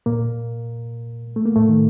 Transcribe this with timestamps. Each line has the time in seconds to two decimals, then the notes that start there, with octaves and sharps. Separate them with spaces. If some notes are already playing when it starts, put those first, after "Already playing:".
0.06 A#2 A#3
1.36 A3
1.46 A#3
1.56 A2 A3
1.69 D#3